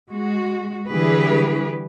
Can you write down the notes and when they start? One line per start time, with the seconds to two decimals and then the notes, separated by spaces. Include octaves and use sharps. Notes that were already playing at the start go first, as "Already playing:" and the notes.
0.11 G#3 F#4
0.90 D3 E3 G3 G4 G#4 B4